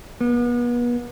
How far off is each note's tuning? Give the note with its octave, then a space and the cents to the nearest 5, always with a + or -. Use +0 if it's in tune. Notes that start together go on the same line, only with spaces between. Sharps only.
B3 -35